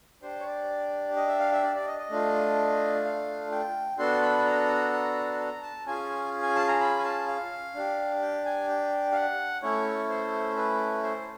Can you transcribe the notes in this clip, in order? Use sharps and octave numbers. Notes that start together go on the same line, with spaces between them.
D4 G4 C5
C#5
D5
D#5
E5
F5
E5
D5
D5
D#5
D#5
A3 D4 F4
F5
G5
B3 D4 F#4 A4 C6
B5
A#5
A#5
A#5
A5
C#4 F4 G#4 G#5
G#5
A5
A#5
B5
G#5
A5
F5
D4 G4
G5
G#5
G5
F5
F#5
A3 C#4 E4 C#5
C5
B4
C5